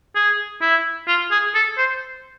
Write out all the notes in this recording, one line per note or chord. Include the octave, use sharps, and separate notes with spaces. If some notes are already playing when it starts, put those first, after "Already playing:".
G#4
E4
F4
G#4
A4
C5